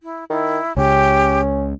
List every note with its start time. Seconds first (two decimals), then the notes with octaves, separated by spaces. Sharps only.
0.03 E4
0.30 D#3 E4
0.77 C#2 C#3 C#4 G4